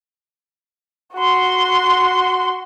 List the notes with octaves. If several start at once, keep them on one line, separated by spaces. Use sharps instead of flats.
F#4 C6